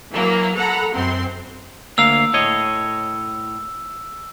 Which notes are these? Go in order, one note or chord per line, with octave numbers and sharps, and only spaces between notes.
E3 F#3 A#3
A4 F#5 A#5 B5
F#2 C4 C6
D2 A#3 F5 E6
A2 C#5 D#5